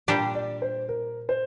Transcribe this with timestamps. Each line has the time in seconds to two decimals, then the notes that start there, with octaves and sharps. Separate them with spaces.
0.08 A#2 G3 D4 G4 G5
0.35 D5
0.62 C5
0.89 A#4
1.29 C5